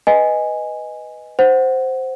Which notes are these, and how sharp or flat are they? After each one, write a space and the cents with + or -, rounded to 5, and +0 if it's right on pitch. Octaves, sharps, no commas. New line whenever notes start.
B4 +0 D#5 +0 G#5 -5
C5 +0 F#5 +5